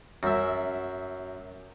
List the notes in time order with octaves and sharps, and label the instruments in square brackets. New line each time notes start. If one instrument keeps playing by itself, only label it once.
[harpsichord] F#2 E5